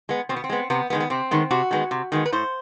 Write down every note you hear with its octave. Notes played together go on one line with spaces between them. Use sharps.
G#3 B3
B2 C4
B3
C4
G#3 B3
C3 B3
D#3 G#3 B3
B3
C3 C4
D#3 G#3 B3
C3 F#4
D#3 G#3 B3
C3
D#3 G#3 B3
B4
A2 C5